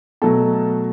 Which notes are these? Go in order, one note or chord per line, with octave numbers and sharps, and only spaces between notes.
B2 F#3 A3 A4